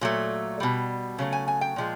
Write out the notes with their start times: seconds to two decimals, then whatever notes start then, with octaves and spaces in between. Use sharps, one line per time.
0.01 A#2 F#3 A3
0.60 B2 G3
1.18 C#3 F#3 A3
1.32 G#5
1.48 G#5
1.61 G5
1.76 A#2 F3 G#3